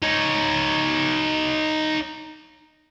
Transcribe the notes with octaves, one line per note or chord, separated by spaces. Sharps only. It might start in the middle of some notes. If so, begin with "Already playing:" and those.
D#4 C#5